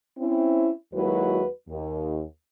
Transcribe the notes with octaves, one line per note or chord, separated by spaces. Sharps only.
C4 C#4 E4
D#2 F#3 G#3 E4 F#4 B4
D#2